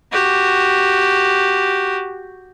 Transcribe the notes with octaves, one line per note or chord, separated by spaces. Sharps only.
F#4 G4